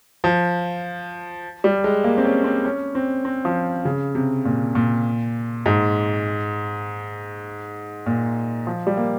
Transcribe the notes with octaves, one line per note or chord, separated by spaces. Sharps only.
F3
G3
G#3
A#3
C4
C#4
C4
C#4
C4
C4
F3
C#3
C3
A#2
A#2
G#2
A#2
F3
G3
A#3